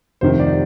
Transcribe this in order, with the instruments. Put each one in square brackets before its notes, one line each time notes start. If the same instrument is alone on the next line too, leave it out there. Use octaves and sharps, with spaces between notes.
[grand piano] F1 F2 C3 D#3 C5
D5